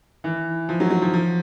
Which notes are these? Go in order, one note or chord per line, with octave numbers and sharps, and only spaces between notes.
E3
F3
F#3
F#3
F3
F3